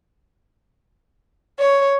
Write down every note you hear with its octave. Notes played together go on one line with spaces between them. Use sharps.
C#5